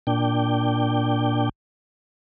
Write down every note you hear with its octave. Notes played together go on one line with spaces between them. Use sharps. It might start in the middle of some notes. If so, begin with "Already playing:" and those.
A#2 D4 G5